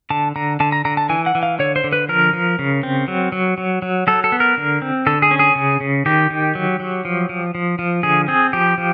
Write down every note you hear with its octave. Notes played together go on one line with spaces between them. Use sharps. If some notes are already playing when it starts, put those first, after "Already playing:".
D3 A5
D3 A#5
D3 A5
A#5
D3 A#5
A5
E3 G#5
F#5
E3
F5
D3 C#5
C5
D3
B4
F3 A#4
F3
C#3
C4
F#3
F#3
F#3
F#3
F#3 A4
A4
B3
A#4
D3
C4
D3 A4
G#4
C#4
G#4
C#3
C#3
D#3 G4
D#3
F#3
F#3
F3
F3
F3
F3
D3 G#4
C4 G#4
F3 G4
F3